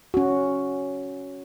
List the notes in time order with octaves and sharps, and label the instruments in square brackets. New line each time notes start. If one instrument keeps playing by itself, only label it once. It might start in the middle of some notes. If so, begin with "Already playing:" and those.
[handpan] C#4 F#4